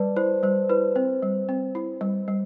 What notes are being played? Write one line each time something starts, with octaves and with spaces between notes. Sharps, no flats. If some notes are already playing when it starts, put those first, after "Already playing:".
Already playing: G3 B4 D5 A5
E4 C5
G3 C5
E4 B4
C4 C5
G3
C4
E4
G3
G3